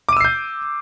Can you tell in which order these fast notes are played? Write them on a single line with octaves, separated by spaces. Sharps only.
D6 D#7 E6 C7 G6